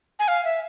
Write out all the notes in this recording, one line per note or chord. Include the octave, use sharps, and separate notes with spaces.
G#5
F5
E5